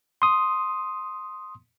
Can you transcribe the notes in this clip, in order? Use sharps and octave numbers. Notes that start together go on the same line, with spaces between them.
C6 D#6